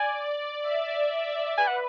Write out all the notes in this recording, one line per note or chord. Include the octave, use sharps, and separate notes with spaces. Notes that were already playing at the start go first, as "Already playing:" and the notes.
Already playing: D5 G#5
D5
E5
D5
B4 G#5
F#5